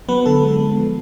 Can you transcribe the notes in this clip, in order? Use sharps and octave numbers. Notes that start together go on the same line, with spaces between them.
F#3 B3 B4
D3 A4
G#3
B3
F3